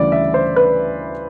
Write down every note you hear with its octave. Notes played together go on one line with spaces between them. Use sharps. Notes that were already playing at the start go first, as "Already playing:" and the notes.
Already playing: D2 C#3 E3 G3 D5
E5
C5
B4